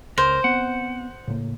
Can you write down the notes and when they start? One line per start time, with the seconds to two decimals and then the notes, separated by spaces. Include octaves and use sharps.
0.18 C#2 A#4 C5
0.44 B3 C4 F#5
1.27 A2 C#3 A#3